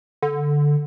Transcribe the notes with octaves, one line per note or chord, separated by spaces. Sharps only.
D3